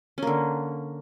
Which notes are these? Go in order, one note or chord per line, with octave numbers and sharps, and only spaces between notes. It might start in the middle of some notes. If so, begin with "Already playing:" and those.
D3 A#3 C#4